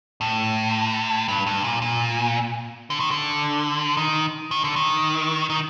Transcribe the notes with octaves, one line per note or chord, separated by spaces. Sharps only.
A2
G2
G2
A#2
A#2
D3
D#3
D3
D#3
D#3
D3
D#3
D#3